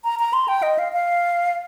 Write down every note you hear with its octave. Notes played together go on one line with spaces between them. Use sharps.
A#5
A#5
C6
G5
D#5
F5
F5